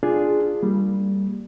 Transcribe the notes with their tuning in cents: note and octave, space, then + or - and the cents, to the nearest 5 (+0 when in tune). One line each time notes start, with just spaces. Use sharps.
D4 +5 F4 +0 G#4 +0
G3 +0 A#3 -15